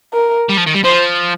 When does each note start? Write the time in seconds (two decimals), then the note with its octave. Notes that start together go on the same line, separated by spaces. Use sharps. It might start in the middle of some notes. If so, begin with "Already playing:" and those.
0.13 A#4
0.49 G3
0.57 F3
0.66 D#3
0.74 G3
0.84 F3 C5